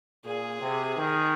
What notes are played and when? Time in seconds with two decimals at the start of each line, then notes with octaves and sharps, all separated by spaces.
0.25 A#2 G#4
0.61 C3
0.97 D#3